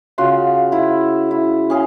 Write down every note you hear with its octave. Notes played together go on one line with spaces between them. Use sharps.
C#3 F4 F#4 C6
E4
E4
C#4 G#4 F5